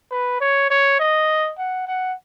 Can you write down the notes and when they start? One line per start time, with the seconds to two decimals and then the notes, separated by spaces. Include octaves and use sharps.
0.11 B4
0.41 C#5
0.70 C#5
1.00 D#5
1.58 F#5
1.88 F#5